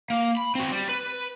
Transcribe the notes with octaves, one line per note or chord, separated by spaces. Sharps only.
A#3
B5
C4 F#4
G3
B4